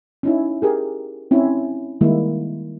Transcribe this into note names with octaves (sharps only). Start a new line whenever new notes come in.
C#4 D#4 E4
G4 G#4 A#4
C4 C#4 E4
D#3 G3 G#3 A#3 E4